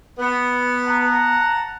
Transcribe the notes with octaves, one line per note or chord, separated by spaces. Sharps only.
B3
F#5 A5 A#5